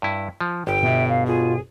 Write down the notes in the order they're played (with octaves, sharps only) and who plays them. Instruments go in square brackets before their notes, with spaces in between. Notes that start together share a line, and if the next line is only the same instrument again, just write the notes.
[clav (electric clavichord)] G2 E4
F3
[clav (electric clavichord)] G1 [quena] G5
[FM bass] B2 [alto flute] E5
[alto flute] F5
[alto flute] F4 [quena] G#4